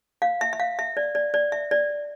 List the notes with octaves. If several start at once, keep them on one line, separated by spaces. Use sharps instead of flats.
F5
E5
E5
F5
E5
D5
D5
D5
E5
D5